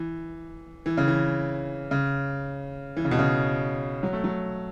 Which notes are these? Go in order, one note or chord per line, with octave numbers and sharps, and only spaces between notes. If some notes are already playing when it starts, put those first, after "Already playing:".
Already playing: E3
E3
C#3
E3
C#3
E3
C#3
B2
C#3
F#3
A3
F#3